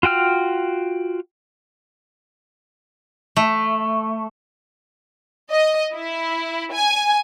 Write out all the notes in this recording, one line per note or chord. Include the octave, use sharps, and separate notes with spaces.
F4 F#4 G5 F6
A3
D#5
E4
G#5